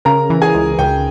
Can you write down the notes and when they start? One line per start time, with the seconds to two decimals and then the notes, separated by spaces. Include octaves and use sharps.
0.05 C#3 A#4 A#5
0.30 E3
0.42 G#4 G#5
0.55 C#2
0.78 C#2 G5